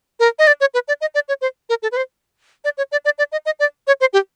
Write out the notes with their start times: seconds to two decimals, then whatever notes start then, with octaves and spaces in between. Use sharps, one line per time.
0.20 A#4
0.39 D#5
0.47 D5
0.61 C#5
0.74 B4
0.88 D5
1.01 D#5
1.15 D5
1.28 C#5
1.41 C5
1.69 A#4
1.83 A4
1.92 B4
1.97 C5
2.65 D5
2.78 C#5
2.92 D5
3.05 D5
3.18 D5
3.32 D#5
3.46 D#5
3.59 D5
3.87 C#5
4.01 C5
4.13 G4